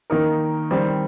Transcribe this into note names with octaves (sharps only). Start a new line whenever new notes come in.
D#3 A#3 D#4 A#4
D#3 G3 C4